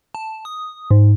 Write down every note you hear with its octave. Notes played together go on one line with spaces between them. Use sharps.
A5
D#6
G#2